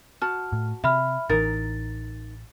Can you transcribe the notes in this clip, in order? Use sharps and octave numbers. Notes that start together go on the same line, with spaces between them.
F#4 A5 F6
A2
C3 E5 B5 F6
A1 E3 D#4 A#4 A6